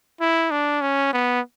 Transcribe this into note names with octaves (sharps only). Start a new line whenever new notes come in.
E4
D4
C#4
B3